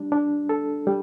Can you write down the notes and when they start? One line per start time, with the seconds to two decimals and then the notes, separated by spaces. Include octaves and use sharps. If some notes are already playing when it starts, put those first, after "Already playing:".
Already playing: G3 D4
0.12 D4
0.49 A4
0.87 G3